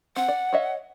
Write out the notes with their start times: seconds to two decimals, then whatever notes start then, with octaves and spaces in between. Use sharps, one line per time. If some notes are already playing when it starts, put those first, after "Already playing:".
0.16 C4 F#5
0.28 D5
0.53 C#5 D#5 E5